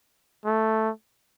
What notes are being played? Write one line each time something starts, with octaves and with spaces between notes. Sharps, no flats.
A3